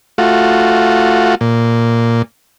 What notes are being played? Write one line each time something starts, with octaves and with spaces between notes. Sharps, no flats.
A3 F4 F#4
A#2